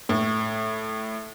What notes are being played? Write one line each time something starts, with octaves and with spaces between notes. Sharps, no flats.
A2